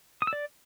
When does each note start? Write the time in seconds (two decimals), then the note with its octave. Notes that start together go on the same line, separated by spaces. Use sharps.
0.22 D#6
0.27 E6
0.33 D5